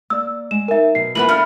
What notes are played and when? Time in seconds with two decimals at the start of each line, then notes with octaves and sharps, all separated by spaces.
0.10 A#3 D5 E6
0.51 G#3 E7
0.68 D#4 A#4 E5 G#5
0.95 B2 F#3 A#4 C7
1.15 E3 G#3 A#3 B3 F4 A#4 F#7
1.29 G2 A3 B5 F6